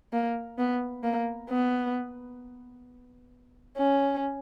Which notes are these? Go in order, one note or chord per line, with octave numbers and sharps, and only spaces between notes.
A#3
B3
A#3
B3
C#4